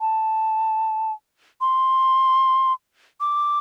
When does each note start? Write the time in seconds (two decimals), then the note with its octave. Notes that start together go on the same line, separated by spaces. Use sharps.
0.01 A5
1.61 C6
3.21 D6